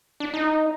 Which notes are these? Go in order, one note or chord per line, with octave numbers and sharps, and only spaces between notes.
D4
D#4